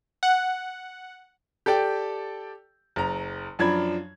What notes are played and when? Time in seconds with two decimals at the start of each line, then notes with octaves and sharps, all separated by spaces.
0.23 F#5
1.66 G4 A4 D5 G5
2.96 F#1 A#5
3.59 F#2 F3 D4 B5 G#6